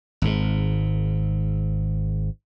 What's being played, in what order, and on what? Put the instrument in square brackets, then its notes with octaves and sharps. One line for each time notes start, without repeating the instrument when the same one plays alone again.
[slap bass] G#1 G#2